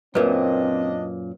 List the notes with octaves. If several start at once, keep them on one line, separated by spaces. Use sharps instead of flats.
F#2 A#2 C4 D4 A#4 B4 D#5